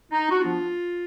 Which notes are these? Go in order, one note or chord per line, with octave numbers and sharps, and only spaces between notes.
D#4
F#4
F3 B3 D4 F4